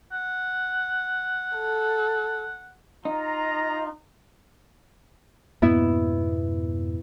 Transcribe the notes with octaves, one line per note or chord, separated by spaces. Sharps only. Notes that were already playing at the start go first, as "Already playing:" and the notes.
F#5
A4
D#4 F4 A#5
F2 G#2 B2 B3 E4 E5